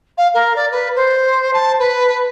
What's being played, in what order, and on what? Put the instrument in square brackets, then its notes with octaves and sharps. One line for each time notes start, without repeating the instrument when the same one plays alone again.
[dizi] F5
A#4
D5
B4
C5
A5
B4